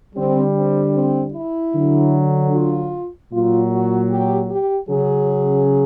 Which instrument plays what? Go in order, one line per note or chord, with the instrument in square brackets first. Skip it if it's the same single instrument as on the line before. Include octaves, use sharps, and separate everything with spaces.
[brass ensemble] D3 G3 C4
C4
C4
E4
D3 F#3
F4
A#2 F#3 F4
F#4
G4
G4
C#3 F#3 G#4